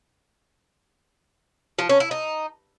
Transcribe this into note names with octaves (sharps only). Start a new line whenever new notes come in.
F3
C#4
E4
D#4